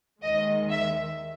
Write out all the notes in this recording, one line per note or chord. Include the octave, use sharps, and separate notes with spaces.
D#2 D#3 G#3 D#5
E5